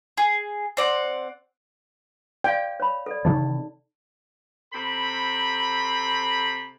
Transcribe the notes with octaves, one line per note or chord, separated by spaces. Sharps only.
G#4
C4 D5 F#5
D5 F5 G5
C#5 B5
A4 D5
C3 D#3 E3 D#4
C3 A4 C5 B5